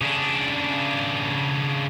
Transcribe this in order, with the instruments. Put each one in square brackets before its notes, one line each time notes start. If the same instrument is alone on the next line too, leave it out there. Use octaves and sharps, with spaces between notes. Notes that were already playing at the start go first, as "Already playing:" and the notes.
[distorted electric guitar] C#3 D4